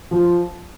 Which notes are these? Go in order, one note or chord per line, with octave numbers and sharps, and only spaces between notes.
F3